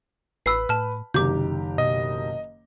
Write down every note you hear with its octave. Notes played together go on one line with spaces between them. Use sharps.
A1 B4 B5 E6 C7
A2 A5 F6
F#1 C3 D#3 G4 D6 G6
B2 D#5